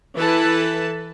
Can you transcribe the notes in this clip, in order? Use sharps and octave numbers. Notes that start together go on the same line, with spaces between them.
E3 A4 B4 A5